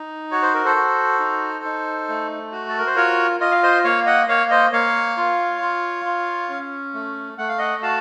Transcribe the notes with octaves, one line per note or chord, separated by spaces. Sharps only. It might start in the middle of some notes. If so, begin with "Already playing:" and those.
Already playing: D#4
F#4 C#5
C5
A#4
A4 C5
F#4
D#4
D#4
A3
F#4
A4
A#4
C5
F4 A#4 C#5
F4 D#5
F5
C5 D#5
A#3 C#5 F5
D#5 F#5
A#3 C#5 F5
C5 D#5
A#3 C#5 F5
F4
F4
F4
C#4
A3
A3 F#5
F5
D#5 F#5
F#4 F5 A5